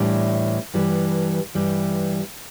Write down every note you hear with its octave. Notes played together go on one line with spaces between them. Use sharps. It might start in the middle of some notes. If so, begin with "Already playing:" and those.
Already playing: A2 E3 G3 D4
G2 E3 G3
G2 E3 G3